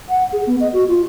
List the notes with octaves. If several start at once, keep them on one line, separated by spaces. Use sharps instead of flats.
F#5
G#4
B3
D#5
F#4
F4